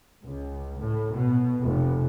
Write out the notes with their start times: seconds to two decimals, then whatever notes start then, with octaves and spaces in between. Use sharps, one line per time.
0.24 C#2
0.78 A2
1.13 B2
1.60 F1